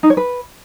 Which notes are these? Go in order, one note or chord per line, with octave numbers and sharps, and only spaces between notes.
D#4
C#5
B4